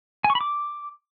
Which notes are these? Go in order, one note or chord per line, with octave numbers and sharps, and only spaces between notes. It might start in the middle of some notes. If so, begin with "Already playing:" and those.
G#5
C#6
B5
D6